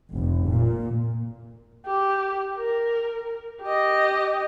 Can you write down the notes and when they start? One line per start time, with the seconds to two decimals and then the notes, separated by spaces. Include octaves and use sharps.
0.13 F1
0.50 A#2
1.86 G4
2.58 A#4
3.62 G4 D#5